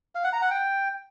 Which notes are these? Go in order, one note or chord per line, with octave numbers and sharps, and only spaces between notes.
F5
F#5
A#5
F#5
G5